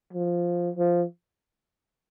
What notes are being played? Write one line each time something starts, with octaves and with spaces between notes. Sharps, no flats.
F3
F3